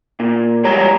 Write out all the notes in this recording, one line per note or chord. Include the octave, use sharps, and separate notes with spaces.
A#2
G3 G#3 C#5 A#5